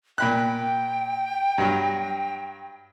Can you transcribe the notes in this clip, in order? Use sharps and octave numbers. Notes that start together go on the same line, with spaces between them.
A#2 G5 B5 F#6
G2 F#3